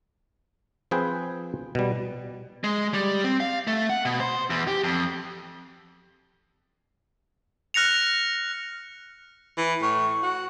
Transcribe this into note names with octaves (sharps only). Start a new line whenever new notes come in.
F3 C4 G#4 B4 G5
B2 G3
G#3
G3
C4
F5
A3
F#5
B2
C5
E2
G4
F2
F6 F#6 A#6 C#7 F7
E3
A2 C#6
F#4